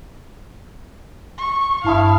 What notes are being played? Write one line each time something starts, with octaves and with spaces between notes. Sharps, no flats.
C#6
G1 G2 E4 F5 A5 D#6